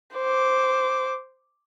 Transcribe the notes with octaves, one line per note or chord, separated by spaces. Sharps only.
C5 D6